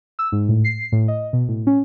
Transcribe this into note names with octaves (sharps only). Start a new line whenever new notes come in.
E6
G#2
A2
C7
A2
D#5
B2
A2
C#4